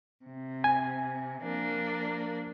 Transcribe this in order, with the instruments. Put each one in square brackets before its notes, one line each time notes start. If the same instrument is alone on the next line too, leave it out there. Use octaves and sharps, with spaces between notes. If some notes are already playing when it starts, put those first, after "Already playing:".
[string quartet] C3
[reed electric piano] G#5
[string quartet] F3 A#3 D4